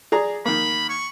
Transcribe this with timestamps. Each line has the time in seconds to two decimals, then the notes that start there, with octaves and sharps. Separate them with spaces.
0.12 G#4 D5 A#5
0.45 D#3 A#3 B5
0.89 C#6